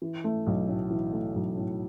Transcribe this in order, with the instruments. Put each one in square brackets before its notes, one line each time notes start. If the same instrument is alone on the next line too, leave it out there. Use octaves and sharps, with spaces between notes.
[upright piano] E3
A3
B1
A2
E3
A3
B1
A2